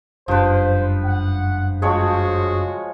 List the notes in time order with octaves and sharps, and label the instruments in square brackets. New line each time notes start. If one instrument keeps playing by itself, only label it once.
[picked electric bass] F#1 G2 [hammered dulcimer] F3 B4 [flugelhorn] C5
[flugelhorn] F#5
[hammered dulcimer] F3 G#3 C#5 [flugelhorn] F#4 [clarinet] G#4